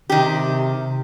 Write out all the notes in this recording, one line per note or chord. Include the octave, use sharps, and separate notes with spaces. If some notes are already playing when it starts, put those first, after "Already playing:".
C3 D#3 G4